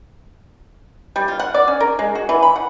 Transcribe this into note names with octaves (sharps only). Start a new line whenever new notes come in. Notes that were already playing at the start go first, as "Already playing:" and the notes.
G3
F4
F#5
D5
C#4
A#4
G#3
F#4
E3
B5
F#5